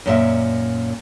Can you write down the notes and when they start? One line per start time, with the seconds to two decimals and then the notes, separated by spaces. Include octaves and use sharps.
0.06 F#2 A#2 E5